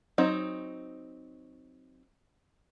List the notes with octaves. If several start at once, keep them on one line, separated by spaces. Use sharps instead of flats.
F#3 C4 D#4